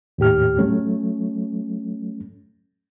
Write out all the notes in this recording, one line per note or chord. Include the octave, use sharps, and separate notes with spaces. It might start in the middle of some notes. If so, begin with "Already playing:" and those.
D#2 A2 G4 F6
F#3 A3 C#4